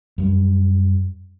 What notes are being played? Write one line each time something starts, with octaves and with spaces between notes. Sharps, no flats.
F#2 G3